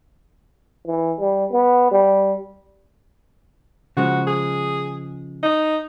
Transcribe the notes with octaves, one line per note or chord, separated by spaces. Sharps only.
E3
G3
B3
G3
C#3 F3 G#3 F#4
G#4
D#4